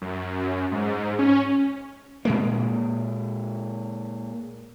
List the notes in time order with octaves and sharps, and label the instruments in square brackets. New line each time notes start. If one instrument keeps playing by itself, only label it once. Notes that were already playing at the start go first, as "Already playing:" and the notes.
[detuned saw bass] F#2
G#2
C#4
[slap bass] A#2 G#3 A#3